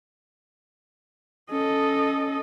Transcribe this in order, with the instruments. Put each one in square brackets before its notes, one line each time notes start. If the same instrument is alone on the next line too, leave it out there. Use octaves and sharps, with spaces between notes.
[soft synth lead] C#4 [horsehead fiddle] A4 D#5